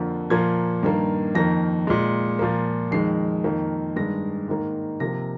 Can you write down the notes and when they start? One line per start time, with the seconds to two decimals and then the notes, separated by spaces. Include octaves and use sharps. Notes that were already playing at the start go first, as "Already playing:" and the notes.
Already playing: F2 D3 F3 A#3
0.30 A#2 F3 A#3 G#6
0.83 G2 D#3 A#3
1.35 F2 D#3 A#3 A#6
1.87 A#2 G#3
2.39 A#2 F3 A#3
2.91 F2 D#3 G#3 C7
3.44 F2 D#3 A#3
3.96 G2 D#3 G#3 A#6
4.48 G#2 D#3 A#3
5.00 C3 F3 A#3 A#6